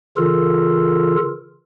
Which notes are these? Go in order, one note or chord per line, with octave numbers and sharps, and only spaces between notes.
C#3 E3 F4 A4 A#4